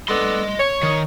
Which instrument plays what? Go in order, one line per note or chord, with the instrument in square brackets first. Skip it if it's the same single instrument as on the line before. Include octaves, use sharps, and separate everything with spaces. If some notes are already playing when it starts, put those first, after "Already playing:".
[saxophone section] B3 D4 A4 [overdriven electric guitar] D#5 C6
[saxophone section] C#5
[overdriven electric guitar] D#3